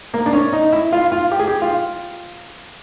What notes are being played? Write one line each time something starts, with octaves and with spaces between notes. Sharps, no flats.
A#3
D4
C#4
D#4
E4
F4
F4
G4
G#4
G4
F4